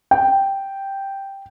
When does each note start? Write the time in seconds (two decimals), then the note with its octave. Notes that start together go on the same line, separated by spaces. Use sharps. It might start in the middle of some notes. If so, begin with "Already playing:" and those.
0.11 G5